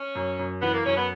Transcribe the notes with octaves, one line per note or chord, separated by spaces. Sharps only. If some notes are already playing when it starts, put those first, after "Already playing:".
Already playing: C#4
F#2
F#2
E3 B3
A#3
F#2 C#4
B3